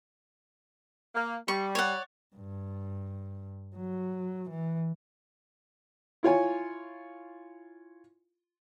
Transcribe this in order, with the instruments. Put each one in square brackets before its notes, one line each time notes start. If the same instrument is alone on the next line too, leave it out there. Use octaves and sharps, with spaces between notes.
[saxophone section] A#3
[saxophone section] G3 [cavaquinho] C#6
[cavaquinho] C#5 D5 F#5
[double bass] G2
F#3
E3
[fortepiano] E4 F4 C#5 G#5